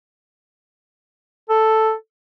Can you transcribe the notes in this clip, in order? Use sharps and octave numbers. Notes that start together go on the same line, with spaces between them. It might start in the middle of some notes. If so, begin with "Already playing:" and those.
A4